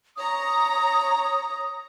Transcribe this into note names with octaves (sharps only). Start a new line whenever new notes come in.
C#5 A#5 D#6